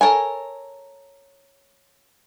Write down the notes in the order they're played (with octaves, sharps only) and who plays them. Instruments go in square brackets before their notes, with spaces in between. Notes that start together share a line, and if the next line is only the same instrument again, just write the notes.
[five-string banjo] A4 A#4 C#5 G#5